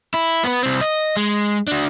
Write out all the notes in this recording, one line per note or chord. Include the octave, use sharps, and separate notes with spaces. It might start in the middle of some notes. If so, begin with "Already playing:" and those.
E4
B3 B4
C2 C4
D#5
G#3
D4 F#4